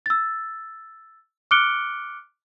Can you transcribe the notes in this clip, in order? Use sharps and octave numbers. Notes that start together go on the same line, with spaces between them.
E6 A6
D6 F6 F#6 C#7 D7 G7